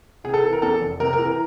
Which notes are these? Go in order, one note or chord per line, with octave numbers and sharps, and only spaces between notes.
C3 G#4
A4
E3
A#4
E2 A4
F1
C3 A#4
A#4
E3
A#4